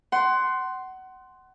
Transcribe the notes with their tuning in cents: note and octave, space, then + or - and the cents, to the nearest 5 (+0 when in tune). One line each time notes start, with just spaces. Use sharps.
F#5 +25 C6 +0